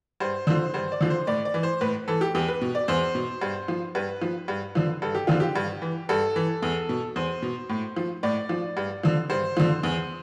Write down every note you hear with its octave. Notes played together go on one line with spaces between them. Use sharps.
G2 C5
D3 F3 C5
G2 C5
D5
D3 F3
C5
A2 D5
D5
E3
C5
A2 B4
E3 A4
G4
E2 G4
B4
B2
D5
E2 C5
B2
G2
F3
G2 B4
F3
G2
D3 F3
G2 A4
G4
D3 F3 F4
G4
G2
E3
G2 A4
E3
E2
B2
E2 C5
B2
A2
F3
A2 D5
F3
G2
D3 F3
G2 C5
D3 F3
E2